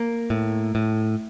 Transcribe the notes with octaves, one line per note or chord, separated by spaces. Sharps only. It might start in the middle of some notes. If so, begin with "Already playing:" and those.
Already playing: A#3
A2
A2